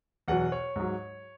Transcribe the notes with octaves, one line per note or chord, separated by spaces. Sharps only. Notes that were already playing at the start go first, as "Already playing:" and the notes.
E2 B2 F#3 F#5
C#5
G#2 F#3